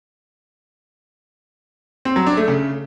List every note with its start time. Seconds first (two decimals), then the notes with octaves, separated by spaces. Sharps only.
2.05 C4
2.16 F#3
2.27 D4
2.37 A3
2.48 C#3